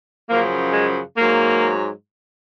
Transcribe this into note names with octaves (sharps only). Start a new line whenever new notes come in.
F#2 C#3 F3 A#3
G#3
G#2 F#3 A#3